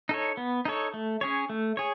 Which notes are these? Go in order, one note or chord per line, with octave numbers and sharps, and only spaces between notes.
D#4 A4 C#5
B3
D#4 A4 C#5
A3
C#4 G#4 C#5
A3
G#4 C#5